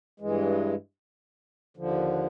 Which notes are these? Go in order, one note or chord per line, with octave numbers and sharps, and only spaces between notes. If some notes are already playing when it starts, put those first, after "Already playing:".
G2 E3 G#3
D#2 D3 F3